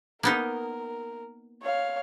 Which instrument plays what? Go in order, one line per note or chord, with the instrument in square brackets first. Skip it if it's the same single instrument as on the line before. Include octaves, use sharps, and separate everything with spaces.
[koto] A#3 B3 D#4 [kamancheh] A#4
[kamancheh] C#5 F5